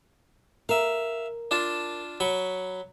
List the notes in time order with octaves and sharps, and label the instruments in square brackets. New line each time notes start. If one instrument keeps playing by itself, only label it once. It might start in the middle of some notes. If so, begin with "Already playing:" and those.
[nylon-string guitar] A#4 [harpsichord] E5 F5
[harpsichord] D4 F4 A5
F#3 B5 C#6